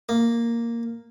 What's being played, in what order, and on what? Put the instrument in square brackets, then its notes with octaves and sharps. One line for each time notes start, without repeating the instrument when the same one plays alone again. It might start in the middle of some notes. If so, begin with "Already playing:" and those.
[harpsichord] A#3